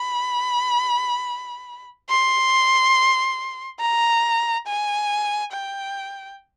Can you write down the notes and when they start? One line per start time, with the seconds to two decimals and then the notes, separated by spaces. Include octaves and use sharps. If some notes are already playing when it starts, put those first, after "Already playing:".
Already playing: B5
2.09 C6
3.80 A#5
4.67 G#5
5.52 G5